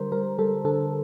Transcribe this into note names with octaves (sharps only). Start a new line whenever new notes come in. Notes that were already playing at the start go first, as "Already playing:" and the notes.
Already playing: D3 G3 A#4 C5
G3 A#4
G3 A4
D3 A4